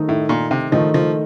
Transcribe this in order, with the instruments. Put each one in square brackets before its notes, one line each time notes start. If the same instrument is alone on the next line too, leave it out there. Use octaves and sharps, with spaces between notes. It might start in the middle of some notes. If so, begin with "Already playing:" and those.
Already playing: [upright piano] D#3 A3 D#4 A4 D#5
[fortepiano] A2
A#2
C3
[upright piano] D#3 A3 D#4 A4 D#5 [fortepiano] F3
[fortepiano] F3